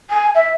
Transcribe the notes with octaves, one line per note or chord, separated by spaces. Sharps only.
G#5
E5